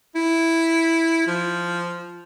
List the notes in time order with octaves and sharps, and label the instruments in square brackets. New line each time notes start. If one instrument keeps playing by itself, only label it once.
[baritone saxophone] E4
F3